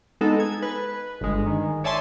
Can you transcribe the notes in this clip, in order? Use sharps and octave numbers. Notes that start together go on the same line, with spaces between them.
G#3 B3 D#4 A4
G#6
B4
G1 G#3
D#3
C#5 D5 E5 G#5 A5 C6